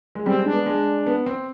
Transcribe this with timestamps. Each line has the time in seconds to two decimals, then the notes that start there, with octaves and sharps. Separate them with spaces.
0.15 G#3
0.26 G3 C4
0.40 G#3
0.46 D4
0.53 B3
0.66 G#3
1.07 B3
1.26 C4